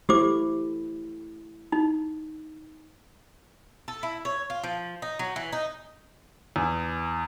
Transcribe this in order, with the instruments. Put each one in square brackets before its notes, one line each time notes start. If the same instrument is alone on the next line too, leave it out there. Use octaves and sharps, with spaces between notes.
[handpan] A3 E4 [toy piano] G4 C5 D6
[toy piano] D#4
[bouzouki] A4
E4
C#5
F4
F3
D#4
F#3
E3
D#4
[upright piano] E2